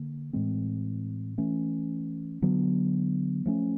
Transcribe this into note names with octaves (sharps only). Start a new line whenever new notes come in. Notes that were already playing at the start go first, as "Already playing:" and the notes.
Already playing: D3 A#3
A2 E3 G#3 C4
E3 A3 C#4
D3 F#3 B3 D4
F3 A3 C#4